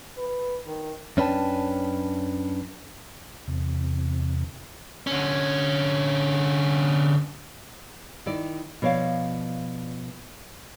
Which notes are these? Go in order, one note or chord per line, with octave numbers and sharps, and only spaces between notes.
B4
D#3
F#2 C#4 D4 B4 G5 A5
E2 C3
D3 C#4
D#3 E4 D5
B2 F3 C#5 D5 F5